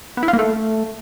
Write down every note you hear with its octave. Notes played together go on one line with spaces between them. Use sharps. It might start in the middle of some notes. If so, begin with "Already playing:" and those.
B3
E4
F4
A#3
A3